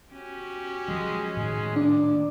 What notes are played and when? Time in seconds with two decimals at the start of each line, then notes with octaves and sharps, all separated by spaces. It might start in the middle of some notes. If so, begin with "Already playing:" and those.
0.12 C#4 F#4 G4
0.88 F3 F#3 G#3
1.37 A2 D#3 G#3
1.76 A#2 D4 D5